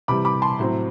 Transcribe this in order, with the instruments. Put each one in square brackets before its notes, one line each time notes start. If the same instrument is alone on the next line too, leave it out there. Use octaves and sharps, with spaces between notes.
[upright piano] C3 E3 G3 B5 D6
B5 D6
A5 C6
A2 F#3 C4